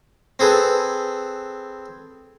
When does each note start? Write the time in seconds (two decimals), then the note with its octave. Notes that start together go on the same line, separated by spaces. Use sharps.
0.39 C4 G#4 A4 B4